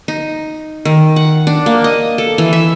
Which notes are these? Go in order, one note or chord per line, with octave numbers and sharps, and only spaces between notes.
D#4
D#3
F#5
D4
A#3
D#5
A4
E3
E5